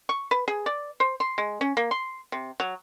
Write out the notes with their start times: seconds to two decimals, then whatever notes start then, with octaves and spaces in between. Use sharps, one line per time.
0.09 C#6
0.31 B4
0.48 G#4
0.66 D5
1.00 C5
1.20 C6
1.38 G#3
1.61 C#4
1.77 A#3
1.91 C6
2.32 C3
2.60 F#3